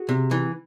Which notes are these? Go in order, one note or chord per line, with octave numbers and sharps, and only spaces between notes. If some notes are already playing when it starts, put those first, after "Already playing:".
Already playing: F#4 G#4
C3
E3